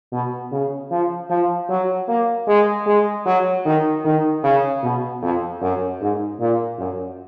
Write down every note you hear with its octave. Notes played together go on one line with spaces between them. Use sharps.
B2
C#3
F3
F3
F#3
A#3
G#3
G#3
F#3
D#3
D#3
C#3
B2
F2
F#2
G#2
A#2
F#2